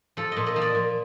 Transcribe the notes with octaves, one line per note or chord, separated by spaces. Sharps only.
F3 A4
A#2 D#5
D#5
F3
D5
A#2